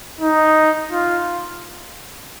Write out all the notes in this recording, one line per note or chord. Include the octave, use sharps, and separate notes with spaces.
D#4
F4